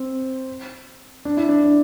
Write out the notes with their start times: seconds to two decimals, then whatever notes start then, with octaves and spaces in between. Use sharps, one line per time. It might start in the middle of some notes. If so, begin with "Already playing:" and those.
Already playing: C4
1.25 D4
1.37 E4
1.49 D4
1.64 D4